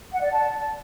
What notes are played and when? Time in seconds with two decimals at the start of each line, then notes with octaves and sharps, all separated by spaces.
0.12 F#5
0.21 D5
0.30 A5